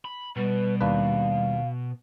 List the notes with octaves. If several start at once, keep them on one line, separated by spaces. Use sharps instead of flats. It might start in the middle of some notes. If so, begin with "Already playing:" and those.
B5
B2 G3 B4
D#2 D4 B4 F5